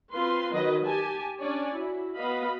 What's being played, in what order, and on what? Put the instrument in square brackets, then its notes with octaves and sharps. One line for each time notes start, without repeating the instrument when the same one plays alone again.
[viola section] C4 F4 B4 C6
D#3 F#3 B4 D#5
G4 G#5 A5
C#4 D4 C#5 D5 G#5
E4 F#4
B3 F#4 B4 D#5 F5 B5